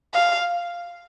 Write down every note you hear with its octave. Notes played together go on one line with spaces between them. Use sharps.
F5